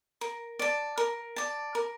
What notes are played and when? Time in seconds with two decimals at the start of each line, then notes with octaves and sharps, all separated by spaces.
0.21 A#4
0.59 D5 A5
0.98 A#4
1.36 D5 A5
1.75 A#4